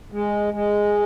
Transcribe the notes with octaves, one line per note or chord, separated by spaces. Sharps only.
G#3
G#3